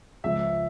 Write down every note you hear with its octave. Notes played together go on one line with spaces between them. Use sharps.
C#2 C#3 F3 E5